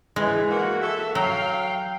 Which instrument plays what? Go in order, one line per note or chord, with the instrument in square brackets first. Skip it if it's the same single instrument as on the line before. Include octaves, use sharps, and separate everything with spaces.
[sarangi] E3 [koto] G#3
[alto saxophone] A#3 [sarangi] F#4
[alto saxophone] A4 [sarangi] E5
[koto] F#3 [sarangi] F5 [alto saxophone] G5